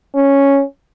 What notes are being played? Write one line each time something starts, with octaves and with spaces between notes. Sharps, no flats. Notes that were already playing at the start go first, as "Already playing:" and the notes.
C#4